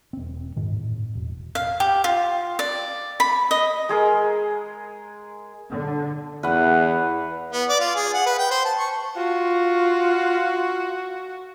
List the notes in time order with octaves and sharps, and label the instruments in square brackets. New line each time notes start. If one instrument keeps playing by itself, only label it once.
[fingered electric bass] E1 C4
G#2 D#3
A2
E1
[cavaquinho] F5
G4
F4
D5
B5
D#5
[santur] G#3 G#4 A#4
[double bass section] D3
[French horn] E2 [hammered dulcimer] B4 F#5
[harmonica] B3
D5
F4
G#4
F#5
B4
G5
C5
A5
C#6
[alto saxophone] F4 [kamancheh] F#4